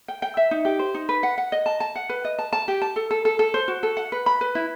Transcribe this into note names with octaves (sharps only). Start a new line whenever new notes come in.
G5
G5
E5
D#4
G4
C5
D#4
B4
F#5
F#5
D#5
A5
A5
F#5
B4
D#5
A5
A5
G4
A5
A4
A4
A4
A4
C5
F#4
A4
F#5
B4
B5
B4
E4